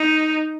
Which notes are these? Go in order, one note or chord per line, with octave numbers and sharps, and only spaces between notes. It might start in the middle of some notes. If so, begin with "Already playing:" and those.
Already playing: D#4